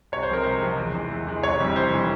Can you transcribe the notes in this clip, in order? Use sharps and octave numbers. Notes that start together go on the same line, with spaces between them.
C2 C#5
C5
C3 F3 G#3 A#4
C2 C5
C3 F3 G#3
E2
E3 G#3
E2
E3 G#3
F1 C#5
F2 E3 G3
F1 C5
E3 G3